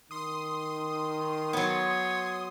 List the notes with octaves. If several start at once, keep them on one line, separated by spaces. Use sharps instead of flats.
D#3 C6 D#6
F#3 B3 C#5